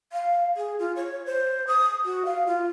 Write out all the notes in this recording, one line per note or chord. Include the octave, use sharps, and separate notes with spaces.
F5
G#4
F4
C#5
C5
D#6
F#4
F5
F4